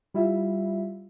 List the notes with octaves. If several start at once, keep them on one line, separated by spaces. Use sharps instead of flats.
G3 E4 F4 E5